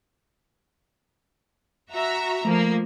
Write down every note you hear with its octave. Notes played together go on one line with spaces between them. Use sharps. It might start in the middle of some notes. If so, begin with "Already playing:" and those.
F#4 E5 A#5
F3 A3 A#3